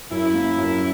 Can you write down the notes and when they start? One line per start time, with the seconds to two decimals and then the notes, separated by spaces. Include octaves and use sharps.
0.11 F#2 E4
0.34 A#3
0.58 F#2